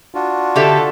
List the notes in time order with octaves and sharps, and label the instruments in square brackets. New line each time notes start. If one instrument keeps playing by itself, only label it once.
[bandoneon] D4 F4 F#4
[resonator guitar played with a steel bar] D3 G4 E5 [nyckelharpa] A4